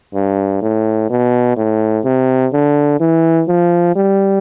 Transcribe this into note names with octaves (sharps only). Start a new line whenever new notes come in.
G2
A2
B2
A2
C3
D3
E3
F3
G3